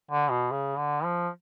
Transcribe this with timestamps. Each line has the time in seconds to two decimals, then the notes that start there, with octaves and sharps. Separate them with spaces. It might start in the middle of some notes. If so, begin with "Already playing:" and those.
0.11 D3
0.30 B2
0.51 C#3
0.78 D3
1.04 F3